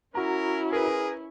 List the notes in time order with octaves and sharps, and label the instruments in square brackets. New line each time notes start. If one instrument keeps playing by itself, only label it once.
[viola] C#4 E4 [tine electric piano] F#4 A#5 [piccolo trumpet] A#4
[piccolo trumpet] G#4 [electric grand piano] A#4 B4